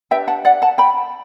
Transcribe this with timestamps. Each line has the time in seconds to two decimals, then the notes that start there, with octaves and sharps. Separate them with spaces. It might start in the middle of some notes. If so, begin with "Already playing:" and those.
0.11 D4 G4 B4 E5 G5
0.28 F#5 A5
0.45 D5 F#5
0.62 F#5 A5
0.78 G5 B5